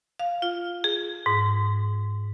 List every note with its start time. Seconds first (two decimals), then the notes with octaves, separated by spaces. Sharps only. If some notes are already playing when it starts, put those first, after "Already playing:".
0.19 F5
0.42 F4
0.84 G#4
1.26 G#2